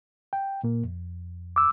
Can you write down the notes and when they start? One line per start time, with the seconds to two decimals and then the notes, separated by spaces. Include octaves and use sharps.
0.33 G5
0.64 A#2 A#3
0.84 F2
1.56 D6 E6